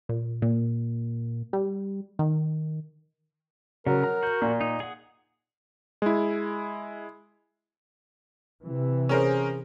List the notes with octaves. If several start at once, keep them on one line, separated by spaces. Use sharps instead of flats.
A#2
A#2
G3
D#3
C#3 F#3 A#4
A#5
F#4 G6
A#2
D#4
G#4 F#5
G#3 E4
C3 E3
C#4 G#4 A#4 C5